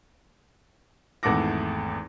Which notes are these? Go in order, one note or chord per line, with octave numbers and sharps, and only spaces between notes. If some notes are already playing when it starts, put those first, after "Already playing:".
G#1 E2 A3 F#5 D6 A#6